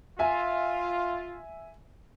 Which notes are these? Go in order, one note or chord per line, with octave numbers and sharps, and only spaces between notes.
F4 E5 G#5